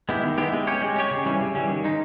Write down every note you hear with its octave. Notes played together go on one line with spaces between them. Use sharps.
G#3 B3 E4 G4
D#3
G#3 B3 E4 G4
G#3
C#4 G4 C#5
G#3
C#4 G4 C#5
C#3
E3 G3 C#4
C#3
E3 G3 C#4
D#3
G#3 D#4